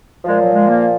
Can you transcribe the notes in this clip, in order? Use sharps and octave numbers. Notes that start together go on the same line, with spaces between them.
A#2 F3 G#3
F#3
G#3
A#3